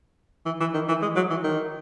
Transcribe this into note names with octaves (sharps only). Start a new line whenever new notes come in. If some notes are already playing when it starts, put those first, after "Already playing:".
E3
E3
D#3
E3
G#3
F#3
E3
D#3